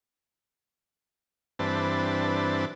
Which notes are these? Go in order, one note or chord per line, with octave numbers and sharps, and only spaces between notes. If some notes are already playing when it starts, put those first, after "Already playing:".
G2 E3 C4 D4 B4 A5